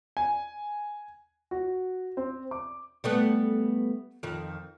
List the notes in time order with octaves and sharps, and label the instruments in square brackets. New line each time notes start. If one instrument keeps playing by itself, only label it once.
[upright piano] G#5
F#4
C4
D6
[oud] G3 A3 B3
F2 D#3